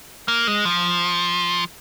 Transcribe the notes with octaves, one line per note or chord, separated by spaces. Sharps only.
A#3
G#3
F3